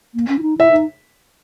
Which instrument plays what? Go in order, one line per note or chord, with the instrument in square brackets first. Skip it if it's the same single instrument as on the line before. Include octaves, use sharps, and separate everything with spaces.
[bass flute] A#3
C#4
E4
D#4
[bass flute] E4 [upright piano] E5
[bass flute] D#4